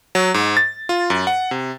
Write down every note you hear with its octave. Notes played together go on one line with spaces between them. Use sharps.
F#3
G#2
A6
F4
F#2
F#5
C3